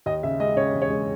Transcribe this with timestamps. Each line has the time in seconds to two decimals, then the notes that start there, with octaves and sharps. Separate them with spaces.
0.06 D#2 D#5
0.23 C#3 E5
0.40 G#3 D#5
0.56 C#3 C#5
0.73 E1
0.82 C#5
0.90 G#3